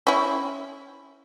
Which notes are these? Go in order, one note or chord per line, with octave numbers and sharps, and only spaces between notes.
C#4 E4